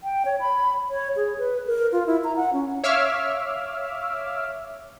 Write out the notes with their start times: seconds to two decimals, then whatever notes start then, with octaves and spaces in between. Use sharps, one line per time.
0.04 G5
0.25 C#5
0.40 B5
0.90 C#5
1.16 G#4
1.38 B4
1.67 A#4
1.92 F4
2.06 E4
2.24 A#5
2.36 F#5
2.53 C#4
2.84 C#5 E5 F5 D6 E6 F6